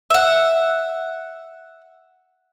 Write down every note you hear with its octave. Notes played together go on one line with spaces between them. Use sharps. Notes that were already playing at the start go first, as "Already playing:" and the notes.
E5 F#5